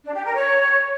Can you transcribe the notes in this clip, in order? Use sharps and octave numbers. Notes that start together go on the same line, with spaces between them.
D4
G4
A#4
C#5